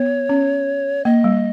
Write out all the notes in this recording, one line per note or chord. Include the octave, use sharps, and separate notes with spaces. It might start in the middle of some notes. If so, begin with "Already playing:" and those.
Already playing: B3 C#5
C#4
A#3 D#5
G3